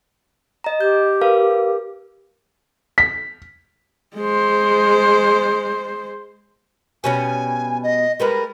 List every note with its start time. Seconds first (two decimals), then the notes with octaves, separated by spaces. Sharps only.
0.64 D#5 A#5
0.81 G4 G6
1.21 A#4 B4 F5
2.98 B6
4.17 G#3 C5
7.04 B2 G3 C#4 G#5
7.83 D#5
8.20 G3 G#3 A#4 B4